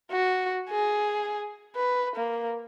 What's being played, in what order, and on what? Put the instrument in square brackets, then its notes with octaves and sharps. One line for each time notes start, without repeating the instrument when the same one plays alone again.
[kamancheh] F#4
G#4
B4
A#3